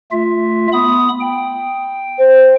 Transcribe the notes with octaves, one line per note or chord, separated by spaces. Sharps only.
A3 F4 E5
B3 B5 D#6
G5
C5